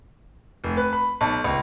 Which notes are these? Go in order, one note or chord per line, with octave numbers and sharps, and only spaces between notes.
F1
B4
B5
B1
C#2